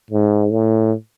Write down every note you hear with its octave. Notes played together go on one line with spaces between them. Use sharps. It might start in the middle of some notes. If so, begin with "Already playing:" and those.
G#2
A2